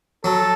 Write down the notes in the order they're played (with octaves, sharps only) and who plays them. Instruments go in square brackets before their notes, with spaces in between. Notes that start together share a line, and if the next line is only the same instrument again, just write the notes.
[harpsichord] F#3 [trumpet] A4